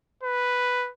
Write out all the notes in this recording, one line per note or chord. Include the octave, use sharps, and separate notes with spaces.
B4